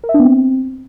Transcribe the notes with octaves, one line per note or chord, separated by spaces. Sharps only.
A#4
E5
D4
B3
C4